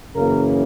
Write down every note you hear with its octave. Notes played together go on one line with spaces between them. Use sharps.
F#2 C#3 E3 A#3 A#4